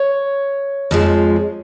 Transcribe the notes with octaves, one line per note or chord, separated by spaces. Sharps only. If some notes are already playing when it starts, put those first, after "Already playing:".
Already playing: C#5
F2 F3 G#3